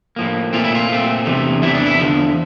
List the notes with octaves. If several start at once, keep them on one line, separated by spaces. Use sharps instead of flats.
A2 F3 A#3
A#2 A3 C4 F4
E4
F4
A#2 A3 C4
E2 C3 E3 A3
E2 C3 E3 A3 E4
D4
E4
E2 D3 F3